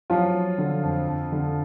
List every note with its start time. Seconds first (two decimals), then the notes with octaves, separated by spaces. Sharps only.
0.10 F3 F#3 F4
0.34 F#3
0.58 D3
0.83 F2
1.07 F2
1.32 D3